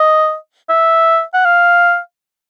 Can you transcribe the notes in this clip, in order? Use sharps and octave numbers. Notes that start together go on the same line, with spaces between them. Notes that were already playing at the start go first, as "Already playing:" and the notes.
Already playing: D#5
E5
F#5
F5